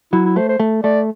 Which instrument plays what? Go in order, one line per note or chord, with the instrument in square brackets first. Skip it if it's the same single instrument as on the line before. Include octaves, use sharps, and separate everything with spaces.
[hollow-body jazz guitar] F#3 [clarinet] E4
[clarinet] E4
[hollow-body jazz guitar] A3 [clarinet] C5
[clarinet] C5
[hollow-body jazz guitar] A3
[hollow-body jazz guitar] A3 [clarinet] D5